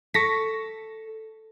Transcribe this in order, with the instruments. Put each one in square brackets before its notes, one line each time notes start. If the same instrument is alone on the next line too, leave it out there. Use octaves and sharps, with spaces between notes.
[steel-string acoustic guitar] A4 [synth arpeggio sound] C#6 A#6 B6